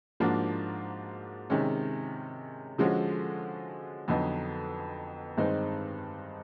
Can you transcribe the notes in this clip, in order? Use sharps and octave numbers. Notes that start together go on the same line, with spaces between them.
G#2 F3 A#3 D4 F#4
C3 D#3 G#3 C#4
D3 F3 G#3 C#4 F#4
F2 D3 F#3 B3 D#4
G2 D#3 G#3 C4 D#4